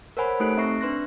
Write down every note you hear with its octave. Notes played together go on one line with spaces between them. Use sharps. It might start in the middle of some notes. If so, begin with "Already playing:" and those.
A#4 C5 C#5 F#5 G#5 B5
A3 D#4 G4 A4 F#6 D7
C4 E5 A#5 C#6 C7
D4 B4 C6 F#6 A#6